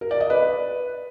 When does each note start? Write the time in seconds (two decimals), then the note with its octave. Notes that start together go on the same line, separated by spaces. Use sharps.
0.01 A#4
0.11 D5
0.20 D#5
0.30 B4